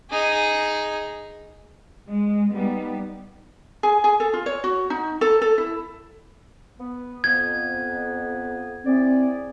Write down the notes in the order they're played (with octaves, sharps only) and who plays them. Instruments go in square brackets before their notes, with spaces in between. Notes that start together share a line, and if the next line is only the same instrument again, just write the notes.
[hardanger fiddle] D#4 G#4
[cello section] G#3
G3 B3 D#4
[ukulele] G#4
G#4
A4
F4
C#5
F#4
D#4
A4
A4
E4
[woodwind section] B3
[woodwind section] F2 B3 [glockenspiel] G#6
[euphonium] C4 [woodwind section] E4 G#4 D5